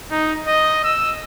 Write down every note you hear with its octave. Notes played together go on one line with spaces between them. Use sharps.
D#4
D#5
E6